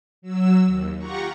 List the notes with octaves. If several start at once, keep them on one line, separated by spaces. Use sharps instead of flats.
F#3 E6
D#2
F4 G4 F#5 A#5 C#6